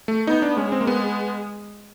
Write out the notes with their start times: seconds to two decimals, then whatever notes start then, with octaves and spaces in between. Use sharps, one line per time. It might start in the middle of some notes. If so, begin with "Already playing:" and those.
0.08 A3
0.27 B3 D#4
0.42 D4
0.57 G#3 C#4
0.72 C4
0.81 A#3
0.87 B3